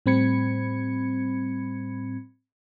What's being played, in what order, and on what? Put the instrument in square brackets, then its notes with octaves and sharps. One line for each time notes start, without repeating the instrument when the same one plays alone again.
[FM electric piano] A2 G3 C4 B5 G#6 C#7